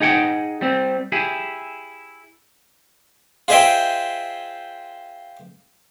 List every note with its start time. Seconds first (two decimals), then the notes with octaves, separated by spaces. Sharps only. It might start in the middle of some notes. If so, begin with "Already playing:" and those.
0.01 D#4 G#4 F#5 G5
0.61 G3 C4
1.12 E4 G4 G#4
3.48 F4 G#4 C5 D#5 E5 G5